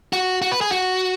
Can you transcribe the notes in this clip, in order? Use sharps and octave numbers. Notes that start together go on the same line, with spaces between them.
F#4
F#4
B4
G#4
F#4